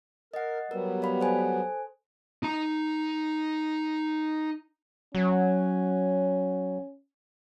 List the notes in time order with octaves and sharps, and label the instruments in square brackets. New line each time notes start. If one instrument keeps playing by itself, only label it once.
[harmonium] A#4 [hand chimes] D#5 F#5
[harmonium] F#3 G3 B3 [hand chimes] A#4
[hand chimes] D5 F5 B5
A4 C5 G#5
[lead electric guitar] D#4 A#5
[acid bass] F#3 [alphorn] C#4